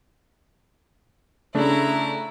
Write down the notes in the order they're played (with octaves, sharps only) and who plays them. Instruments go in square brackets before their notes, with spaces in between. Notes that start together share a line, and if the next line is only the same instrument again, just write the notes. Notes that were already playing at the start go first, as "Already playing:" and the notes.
[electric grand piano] C#3 A3 D4 [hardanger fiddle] E4 A#5